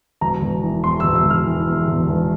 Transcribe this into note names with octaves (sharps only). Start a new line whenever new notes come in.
E1 A#5
E1
E3
E2 C6
E1 E6
E6
E1 F6
E3
E2
E1
E1